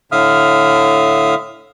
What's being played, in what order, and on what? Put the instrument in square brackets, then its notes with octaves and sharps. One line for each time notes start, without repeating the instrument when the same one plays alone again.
[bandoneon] A2 D3 E5 F5 D#6 F6